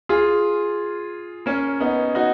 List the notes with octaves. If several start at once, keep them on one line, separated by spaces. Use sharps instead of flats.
F4 G#4
A#3 C#4
B3 D#4
D#4 F#4